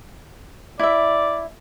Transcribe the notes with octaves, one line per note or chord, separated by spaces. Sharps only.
E4 D5 E5